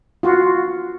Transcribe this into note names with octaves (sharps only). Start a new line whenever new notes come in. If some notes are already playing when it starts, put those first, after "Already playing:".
F4 F#4